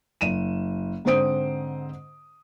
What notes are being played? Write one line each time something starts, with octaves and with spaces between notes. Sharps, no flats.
F#1 D#7 E7
G#2 D3 C4 C5 D#6 D7